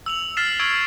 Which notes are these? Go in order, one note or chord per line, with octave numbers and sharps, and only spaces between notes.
E6 F7 F#7
E6 F6 A6 B6 C7 E7
C#6 E6 G#6 D7